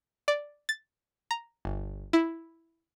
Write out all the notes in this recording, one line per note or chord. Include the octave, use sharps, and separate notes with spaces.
D5
A6
A#5
G1
E4